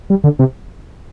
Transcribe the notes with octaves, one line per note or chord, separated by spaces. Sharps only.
G3
D3
C3